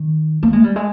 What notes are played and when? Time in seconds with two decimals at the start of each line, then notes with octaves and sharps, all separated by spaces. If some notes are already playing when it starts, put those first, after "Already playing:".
Already playing: D#3
0.43 A#3
0.53 G#3
0.64 G3
0.76 G#3